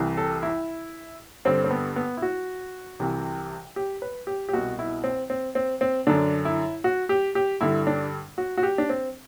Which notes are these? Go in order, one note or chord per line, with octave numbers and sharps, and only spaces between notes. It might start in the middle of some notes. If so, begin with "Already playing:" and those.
Already playing: C2 C3 E3
A4
E4
G2 D3 C4
C4
B3
B3
E4
F#4
C2 C3 E3
G4
B4
G4
G4
C2 B2 F#4
E4
C4
C4
C4
C4
F#2 D3 D4
E4
F#4
G4
G4
G2 D3 E4
D4
F#4
F#4
G4
D4
C4